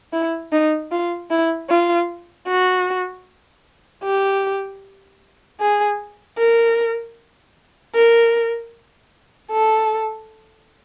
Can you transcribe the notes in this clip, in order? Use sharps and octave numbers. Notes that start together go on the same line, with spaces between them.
E4
D#4
F4
E4
F4
F#4
G4
G#4
A#4
A#4
A4